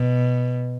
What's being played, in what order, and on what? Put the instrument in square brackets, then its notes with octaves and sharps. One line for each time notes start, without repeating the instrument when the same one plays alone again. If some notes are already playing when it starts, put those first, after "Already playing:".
Already playing: [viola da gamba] B2